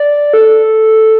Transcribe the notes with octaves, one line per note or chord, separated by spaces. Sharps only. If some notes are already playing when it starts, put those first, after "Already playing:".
Already playing: D5
A4